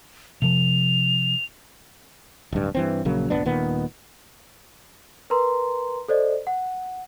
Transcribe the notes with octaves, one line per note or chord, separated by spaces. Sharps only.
C3 F3 F7
D1 G2
G2 E3 C4
A#1 C#3 F#3 A#3
F1 A#1 B3 D4
D#1 A#2 D#3 B3
A#4 B4 A#5 C6
A4 C5 D5 D#5
F#5